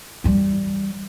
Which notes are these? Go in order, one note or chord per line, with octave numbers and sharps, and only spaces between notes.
E3 G3